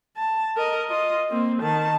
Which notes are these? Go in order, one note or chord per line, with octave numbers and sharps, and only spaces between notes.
A5
A#4 D#5
F4 D#5
A#3 C4
D#3 A5